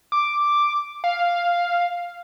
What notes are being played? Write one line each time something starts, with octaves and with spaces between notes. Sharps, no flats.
D6
F5